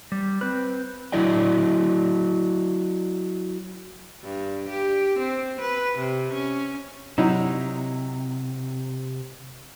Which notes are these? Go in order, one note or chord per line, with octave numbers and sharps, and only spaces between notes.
G3
C4 B4
F#3 E4 D5 D#5 G5
G2
G4
C4
B4
C3
C#4
C3 F#3 D#4 E4